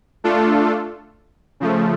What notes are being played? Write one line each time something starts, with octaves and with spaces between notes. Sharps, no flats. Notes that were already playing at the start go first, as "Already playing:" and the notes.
A3 D4 F4 A4
C#3 F3 A3